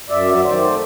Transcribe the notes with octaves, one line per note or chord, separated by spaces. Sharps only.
F#2 D5 E5
F#3
D#3 C5 D5
A3